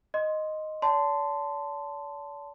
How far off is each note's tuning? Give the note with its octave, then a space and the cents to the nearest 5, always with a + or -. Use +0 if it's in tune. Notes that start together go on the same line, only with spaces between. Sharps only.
D#5 +0 C6 +0
D5 -45 A5 +0 C6 -15